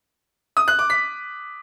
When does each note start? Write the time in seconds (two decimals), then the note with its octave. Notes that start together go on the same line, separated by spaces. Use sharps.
0.57 D#6
0.68 F#6
0.79 D6
0.90 B6